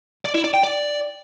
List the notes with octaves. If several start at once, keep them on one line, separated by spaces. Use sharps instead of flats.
D5
E4
D5
G5
D5